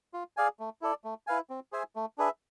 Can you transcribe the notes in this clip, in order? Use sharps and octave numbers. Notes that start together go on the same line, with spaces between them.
F4
G#4 D5 F5 G#5
A3
E4 A4 D5
A3
E4 B4 F5 G#5
C4
G#4 C5 E5 G#5
A3
D4 G#4 B4 E5